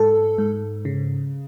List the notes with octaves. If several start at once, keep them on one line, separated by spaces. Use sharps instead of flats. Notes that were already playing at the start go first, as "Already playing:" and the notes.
Already playing: G#2 A4
G#2
C#3